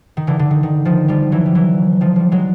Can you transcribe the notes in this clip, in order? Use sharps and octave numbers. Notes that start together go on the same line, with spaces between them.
D#3
D3 E3
D3
D#3
D#3
D#3 F3
F3 G3
E3 F#3
G3
E3 F#3
D#3 F3
F3 G3
F#3 G#3